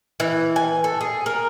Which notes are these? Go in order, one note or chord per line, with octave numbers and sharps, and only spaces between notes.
E3
G#5
A4
G#4
A#4